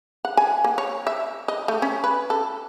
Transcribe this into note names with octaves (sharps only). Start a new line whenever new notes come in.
F#5
G#5
A#3
C#5
E5
D#5
A3
C#4
B4
A4